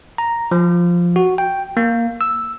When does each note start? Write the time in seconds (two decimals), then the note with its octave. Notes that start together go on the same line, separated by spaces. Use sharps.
0.18 A#5
0.51 F3
1.16 F#4
1.38 G5
1.77 A#3
2.21 E6